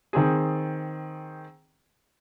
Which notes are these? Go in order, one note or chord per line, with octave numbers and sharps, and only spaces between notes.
D#3 C4 G#4